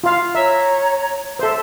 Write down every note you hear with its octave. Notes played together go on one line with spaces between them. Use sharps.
F4 F5
C#5 E5 A#5
A4 C5 E5